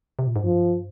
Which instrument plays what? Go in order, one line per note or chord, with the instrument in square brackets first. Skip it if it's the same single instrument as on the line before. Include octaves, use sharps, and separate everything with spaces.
[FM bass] C3
A#2
G#2
[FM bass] G2 [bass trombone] F3